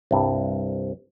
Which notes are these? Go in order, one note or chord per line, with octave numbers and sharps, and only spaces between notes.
C2 G2